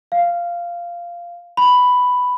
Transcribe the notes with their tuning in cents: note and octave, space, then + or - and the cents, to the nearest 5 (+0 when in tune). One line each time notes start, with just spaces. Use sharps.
F5 -10
B5 +5